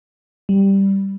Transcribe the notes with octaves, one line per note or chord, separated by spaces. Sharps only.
G3